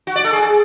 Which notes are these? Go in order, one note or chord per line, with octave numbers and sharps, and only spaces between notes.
F#4
D5
A4
G#4